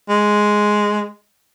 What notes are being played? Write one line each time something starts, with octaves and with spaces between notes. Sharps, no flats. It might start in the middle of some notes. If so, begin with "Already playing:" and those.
G#3